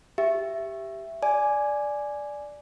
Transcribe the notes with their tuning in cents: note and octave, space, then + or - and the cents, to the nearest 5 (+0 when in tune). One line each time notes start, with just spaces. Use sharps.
G4 +0 E5 +10
D5 +0 G#5 +10